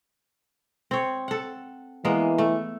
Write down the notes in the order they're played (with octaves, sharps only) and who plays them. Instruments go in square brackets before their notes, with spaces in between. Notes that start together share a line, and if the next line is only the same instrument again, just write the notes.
[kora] C4 C#5
A4 F#5
[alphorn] E3 [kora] G#3 A#3 B3
[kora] A3